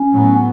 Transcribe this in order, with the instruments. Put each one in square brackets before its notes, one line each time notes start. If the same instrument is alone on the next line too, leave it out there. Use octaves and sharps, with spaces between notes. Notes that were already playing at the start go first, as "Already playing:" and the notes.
Already playing: [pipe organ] C#4
[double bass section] A2 F#3 B3